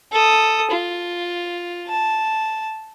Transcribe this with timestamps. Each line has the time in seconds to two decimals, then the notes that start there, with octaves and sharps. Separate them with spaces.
0.12 A4 D#6
0.71 F4
1.87 A5